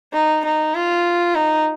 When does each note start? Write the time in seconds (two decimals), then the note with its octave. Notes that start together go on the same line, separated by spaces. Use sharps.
0.13 D#4
0.45 D#4
0.75 F4
1.35 D#4